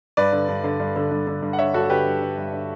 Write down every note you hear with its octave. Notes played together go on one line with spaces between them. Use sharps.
G2 B4 D5
D3
G2
D3
G2
D3
G2
D3
G2
F#5
D3 C#5 E5
G2 F#4 A4
D3 G4 B4
G2
D3
G2
D3